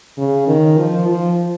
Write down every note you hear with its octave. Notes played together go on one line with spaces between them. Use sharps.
C#3
D#3
F3
F3